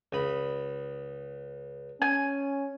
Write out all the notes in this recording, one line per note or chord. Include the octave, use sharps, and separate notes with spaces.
C#2 D#5 B5
C#4 G#5